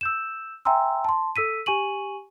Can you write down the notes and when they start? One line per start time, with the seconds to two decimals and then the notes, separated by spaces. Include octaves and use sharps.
0.01 E6 G6 E7
0.65 E5 G5 G#5 A#5 C6 E6
1.05 A5 C6
1.36 A4 E6 B6 D#7
1.66 G4 G#5 C#6 D#7 F#7